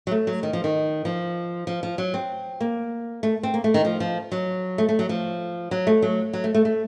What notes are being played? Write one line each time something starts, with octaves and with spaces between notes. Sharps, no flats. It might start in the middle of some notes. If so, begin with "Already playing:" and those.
F#3
A3
F#3
D#3
F3
D#3
F3
F3
F3
F#3
C4
A#3
A3
C4
A#3
A3
D#3
F3
F3
F#3
A3
A3
F#3
F3
F#3
A3
F#3
F#3
A3
A3
A3